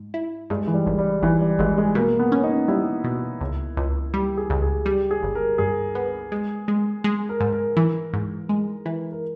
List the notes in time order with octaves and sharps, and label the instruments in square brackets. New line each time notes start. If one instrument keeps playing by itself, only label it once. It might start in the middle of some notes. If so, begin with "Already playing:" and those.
Already playing: [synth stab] G#2
E4
[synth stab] G2 [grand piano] G#3
[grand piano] E3
G3
[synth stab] G#1
[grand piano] G3
[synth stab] G#1 [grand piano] E3
[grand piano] G3
[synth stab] G#1 [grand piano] G#3
[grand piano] G#3
[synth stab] B2 [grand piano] A#3
[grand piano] B3
[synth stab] C#4
[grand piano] D#4
[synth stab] G3 [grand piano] E4
[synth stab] B2
C#2
C#2
[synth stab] G3 [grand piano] G4
[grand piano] G#4
[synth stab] C#2
[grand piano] G#4
[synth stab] G3 [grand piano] G4
[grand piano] G#4
[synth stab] G1
[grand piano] A#4
[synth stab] G2 [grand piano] G#4
[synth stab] B3
G#3
G#3
G#3
[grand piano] A#4
[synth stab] G#2
[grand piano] A#4
[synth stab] E3
G#2
G#3
E3
[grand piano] A#4